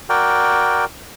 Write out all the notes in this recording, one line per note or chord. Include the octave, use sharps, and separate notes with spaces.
F#4 A#4 D5 G5